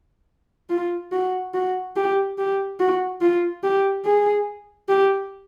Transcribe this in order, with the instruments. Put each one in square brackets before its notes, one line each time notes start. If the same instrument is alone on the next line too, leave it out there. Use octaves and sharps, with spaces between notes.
[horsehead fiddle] F4
F#4
F#4
G4
G4
F#4
F4
G4
G#4
G4